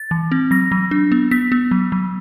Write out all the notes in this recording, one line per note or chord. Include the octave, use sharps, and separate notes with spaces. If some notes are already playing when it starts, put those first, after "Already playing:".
Already playing: A6
E3
C4
F#3 A#6
F#3
D4
B3
B3 B6
B3
F#3
F#3